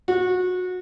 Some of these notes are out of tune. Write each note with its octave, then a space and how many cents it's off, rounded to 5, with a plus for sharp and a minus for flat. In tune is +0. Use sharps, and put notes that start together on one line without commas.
F#4 -25